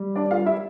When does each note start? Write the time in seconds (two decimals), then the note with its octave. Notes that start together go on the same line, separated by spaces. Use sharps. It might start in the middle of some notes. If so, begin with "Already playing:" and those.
Already playing: G3
0.15 D4 D5
0.31 F4 F5
0.46 E4 E5